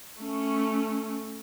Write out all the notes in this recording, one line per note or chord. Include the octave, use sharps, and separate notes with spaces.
A3 C#4